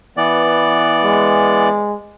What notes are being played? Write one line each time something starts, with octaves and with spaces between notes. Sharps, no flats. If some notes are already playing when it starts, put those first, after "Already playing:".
E3 B3 D5
G#3